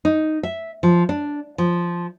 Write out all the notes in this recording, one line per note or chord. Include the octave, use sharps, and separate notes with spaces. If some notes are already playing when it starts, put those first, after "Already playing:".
D#4
E5
F3
D4
F3